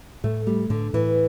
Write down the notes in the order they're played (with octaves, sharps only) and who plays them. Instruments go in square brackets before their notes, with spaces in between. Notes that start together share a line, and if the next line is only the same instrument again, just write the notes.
[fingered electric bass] A2 [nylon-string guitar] A3
[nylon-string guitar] G3 [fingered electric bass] A3
[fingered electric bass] A2 [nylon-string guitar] D3
[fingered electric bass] A2 [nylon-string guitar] E3